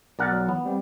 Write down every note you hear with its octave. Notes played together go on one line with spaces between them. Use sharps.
B1 A#4 D5 F#5 A6
F#3
E3 B3
G3 C4